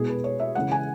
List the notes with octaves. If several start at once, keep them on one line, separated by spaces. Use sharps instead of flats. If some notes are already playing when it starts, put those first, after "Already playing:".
Already playing: B2 G#3 B3 E4 G#4
B4
C#5
E5
C#3 E3 G#3 F#5
G#5